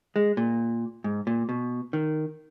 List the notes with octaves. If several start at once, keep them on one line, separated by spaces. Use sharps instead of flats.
G#3
A#2
G#2
A#2
B2
D#3